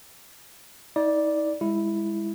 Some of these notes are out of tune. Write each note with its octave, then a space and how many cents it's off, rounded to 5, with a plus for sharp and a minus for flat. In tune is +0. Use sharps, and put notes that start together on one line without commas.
D#4 +40 D5 +0
G#3 -25 E4 +0